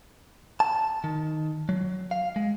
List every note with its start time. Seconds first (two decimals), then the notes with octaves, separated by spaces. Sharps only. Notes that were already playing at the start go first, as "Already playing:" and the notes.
0.60 A5
1.04 D#3
1.69 F#3
2.11 F5
2.36 G#3